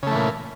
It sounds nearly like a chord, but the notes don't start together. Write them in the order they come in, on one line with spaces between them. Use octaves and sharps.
C#3 A3 E3 A#2